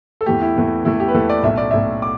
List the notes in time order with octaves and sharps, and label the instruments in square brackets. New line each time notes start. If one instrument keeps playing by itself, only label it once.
[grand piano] A4
E2 E3 A3 G4
E4
E2 E3 A3
E2 E3 A3 E4
G4
B4
E2 E3 A3 A4
D5
B1 A2 A3 E5
D5
B1 A2 A3 E5
D6